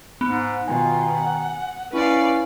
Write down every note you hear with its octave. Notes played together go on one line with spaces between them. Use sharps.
G#2 B3
B2 D#3 F4 G#5
F#5
C#4 E4 B4 D5 F5